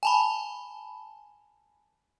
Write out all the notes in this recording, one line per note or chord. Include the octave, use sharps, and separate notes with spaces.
G#5 A5 B5